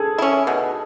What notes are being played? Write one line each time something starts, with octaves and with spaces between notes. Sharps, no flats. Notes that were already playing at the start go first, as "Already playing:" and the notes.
Already playing: G#4 A4
C#4 E4
B2